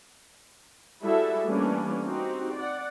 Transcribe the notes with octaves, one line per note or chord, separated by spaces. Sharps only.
G3 E4 F#4 G#4 A4 E5
E3 G3 A3 A#3 C#4 D4
C4 D#4 F#4 G4
D5 F#5